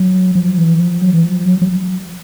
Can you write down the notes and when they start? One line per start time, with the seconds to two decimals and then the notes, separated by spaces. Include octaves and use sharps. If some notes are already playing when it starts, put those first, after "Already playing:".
Already playing: F#3
0.35 F3
0.58 E3
0.80 F3
1.02 F#3
1.14 E3
1.24 F3
1.46 F#3
1.62 F#3